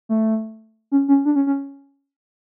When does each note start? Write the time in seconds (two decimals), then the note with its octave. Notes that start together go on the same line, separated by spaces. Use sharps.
0.09 A3
0.92 C#4
1.08 C#4
1.25 D4
1.36 C#4
1.47 C#4